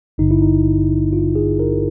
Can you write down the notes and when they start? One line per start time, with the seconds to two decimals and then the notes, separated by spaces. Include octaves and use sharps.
0.18 G#1 G2 D3 D#4
0.31 E4
0.42 D#4
1.13 F4
1.36 G#4
1.59 A#4